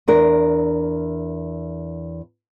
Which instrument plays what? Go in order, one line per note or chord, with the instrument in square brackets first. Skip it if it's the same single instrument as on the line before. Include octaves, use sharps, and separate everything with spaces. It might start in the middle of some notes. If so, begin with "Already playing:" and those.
[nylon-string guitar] E2 D4 A#4